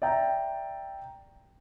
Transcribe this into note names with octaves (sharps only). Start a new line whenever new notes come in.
D5 E5 G5 A#5